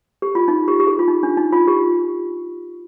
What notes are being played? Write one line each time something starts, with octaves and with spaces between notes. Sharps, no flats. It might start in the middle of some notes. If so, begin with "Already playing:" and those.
G4
F4
D#4
G4
G4
G#4
F4
D#4
D4
D#4
F4
G4